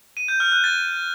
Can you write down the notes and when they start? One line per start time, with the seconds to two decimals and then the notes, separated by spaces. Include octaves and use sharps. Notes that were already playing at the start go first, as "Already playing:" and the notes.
0.17 D#7
0.28 G6
0.40 F6
0.52 F#6
0.64 A6